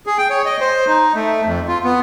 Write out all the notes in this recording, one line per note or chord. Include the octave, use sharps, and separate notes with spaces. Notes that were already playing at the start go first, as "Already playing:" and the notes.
G#4
G5
C#5
D#5
C5
D#4
A3
F2
F4
B3